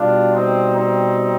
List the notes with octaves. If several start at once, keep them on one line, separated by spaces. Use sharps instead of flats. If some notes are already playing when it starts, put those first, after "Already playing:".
Already playing: B2 G3 D4 F4
C4 D#4
C4 D#4